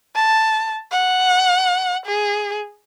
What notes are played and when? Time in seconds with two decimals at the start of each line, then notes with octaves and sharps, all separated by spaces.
0.15 A5
0.92 F#5
2.06 G#4